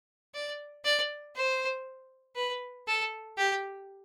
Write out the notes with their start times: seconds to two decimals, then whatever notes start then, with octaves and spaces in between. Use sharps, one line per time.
0.35 D5
0.85 D5
1.36 C5
2.36 B4
2.87 A4
3.38 G4